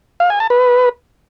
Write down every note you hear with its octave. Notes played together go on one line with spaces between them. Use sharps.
F5
G#5
A5
B4